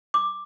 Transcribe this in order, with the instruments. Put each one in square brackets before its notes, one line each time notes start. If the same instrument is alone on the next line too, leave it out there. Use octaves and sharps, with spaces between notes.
[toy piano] D6